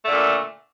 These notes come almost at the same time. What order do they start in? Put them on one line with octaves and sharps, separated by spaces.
A3 D3 A#2